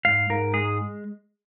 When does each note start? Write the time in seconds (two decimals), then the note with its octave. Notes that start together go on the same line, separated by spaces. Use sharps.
0.05 G#2 F5
0.30 G#2 A#4
0.53 G#3 G#4